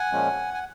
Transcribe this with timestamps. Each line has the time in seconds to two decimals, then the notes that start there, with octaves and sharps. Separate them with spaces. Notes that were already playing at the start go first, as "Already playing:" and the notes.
Already playing: F#5 G#5
0.12 A#2 F3 G#3 C#4
0.54 G#5